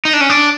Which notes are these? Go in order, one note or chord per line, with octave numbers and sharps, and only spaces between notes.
D#4
D4
C#4
D4